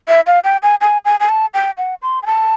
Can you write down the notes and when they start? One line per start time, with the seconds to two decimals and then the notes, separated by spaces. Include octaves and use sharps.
0.08 E5
0.27 F5
0.44 G5
0.63 G#5
0.81 G#5
1.05 G#5
1.20 G#5
1.29 A5
1.54 G5
1.78 F#5
2.02 C6
2.23 G#5
2.26 A5